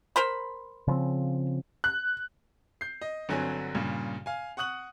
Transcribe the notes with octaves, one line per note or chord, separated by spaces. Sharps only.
A#4 C5 B5
C#3 F3 C4
F#6
G6 C7
D#5
G1 D3 F#3 C4 G#5
G2 A#2 C#3
F5 G#5
F#5 C#6 D#6 F#6 F#7